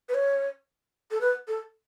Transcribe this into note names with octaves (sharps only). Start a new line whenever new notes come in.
B4
C#5
A4
B4
A4